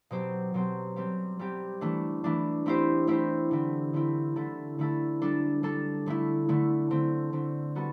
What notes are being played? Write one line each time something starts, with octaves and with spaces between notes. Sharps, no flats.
B2 F#3 C4 G4 C5
B2 F#3 C4 G4 C5
G3 C4 G4
G3 C4 G4
E3 A3 D4
E3 A3 D4
A3 C4 E4 G4 C5
A3 C4 E4 G4 C5
D3 A3 C4 E4
D3 A3 C4 E4
D3 A3 E4 A4
D3 A3 E4 A4
G3 D4 A4
G3 D4 A4
D3 A3 E4
D3 A3 E4
D3 A3 C4
D3 A3 C4
G3 B3 F#4 A4